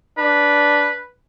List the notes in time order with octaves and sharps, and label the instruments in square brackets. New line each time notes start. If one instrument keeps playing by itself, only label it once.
[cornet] D4 [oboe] B4